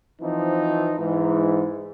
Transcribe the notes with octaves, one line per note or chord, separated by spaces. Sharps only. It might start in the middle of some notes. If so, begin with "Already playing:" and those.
E3 F3 C4 D#4
G#2 E3